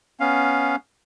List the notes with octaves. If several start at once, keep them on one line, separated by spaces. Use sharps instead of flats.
B3 C#4 F5